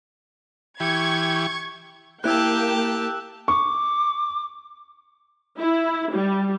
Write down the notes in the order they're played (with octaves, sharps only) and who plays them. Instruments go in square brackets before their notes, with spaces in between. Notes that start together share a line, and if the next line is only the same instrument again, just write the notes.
[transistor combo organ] E3 G4 [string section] C#6 G#6
[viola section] A#3 G5 [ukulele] E4 C5 [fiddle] G4 A5 [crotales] E6 F#6
[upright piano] C#6 [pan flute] D6
[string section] E4
G3